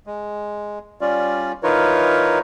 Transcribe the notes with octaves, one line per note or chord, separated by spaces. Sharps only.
G#3
G3 C#4 F4 D5
E3 D#4 F4 A#4 B4 C#5